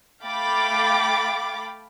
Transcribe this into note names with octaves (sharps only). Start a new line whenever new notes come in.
A3 F5 G5 B5 D6 A6